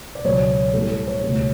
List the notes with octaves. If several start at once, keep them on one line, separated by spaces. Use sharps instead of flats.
D5
C#2 B2 F#3 B3 C#5
A2 G3 B3 A4
A4
C#5
C#2 B2 A3